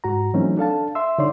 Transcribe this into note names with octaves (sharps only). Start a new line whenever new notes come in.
G#2 F#4 A#5
E3 F#3 A3 C4 C#4 D#4
D4 A4 F5 A5
E5 C6 E6
D3 D#4 C#5 D5 C6